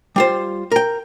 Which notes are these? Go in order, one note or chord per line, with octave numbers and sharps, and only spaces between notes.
G3 F4 C5
A#4 G5